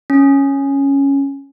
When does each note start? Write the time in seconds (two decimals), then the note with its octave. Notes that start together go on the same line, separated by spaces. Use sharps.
0.10 C#4